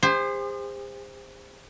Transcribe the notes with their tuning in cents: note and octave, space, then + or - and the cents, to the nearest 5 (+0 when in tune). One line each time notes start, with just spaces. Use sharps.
G#4 -45 C5 +0